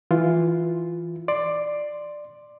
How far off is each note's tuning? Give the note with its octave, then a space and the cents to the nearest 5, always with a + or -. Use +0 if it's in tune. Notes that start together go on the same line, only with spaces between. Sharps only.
E3 +0 F4 +0
D5 +10 C6 +0